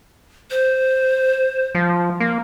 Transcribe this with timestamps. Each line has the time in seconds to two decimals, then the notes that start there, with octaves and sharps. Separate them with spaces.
0.51 C5
1.75 F3
2.20 A#3